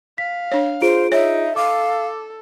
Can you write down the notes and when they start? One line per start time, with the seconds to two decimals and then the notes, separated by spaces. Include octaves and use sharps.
0.18 F5 B6
0.52 D4 C#5
0.82 F4 G#4 C5 D7
1.12 D#4 C#5 E5
1.56 A4 F5 D6